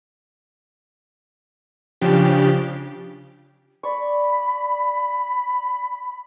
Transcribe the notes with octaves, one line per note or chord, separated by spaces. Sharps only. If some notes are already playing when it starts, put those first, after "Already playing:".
C#3 F3 D4 G4
D5 B5 C#6